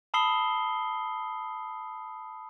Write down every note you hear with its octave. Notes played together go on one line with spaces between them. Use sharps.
A5 B5 D#6 E6 C7 G7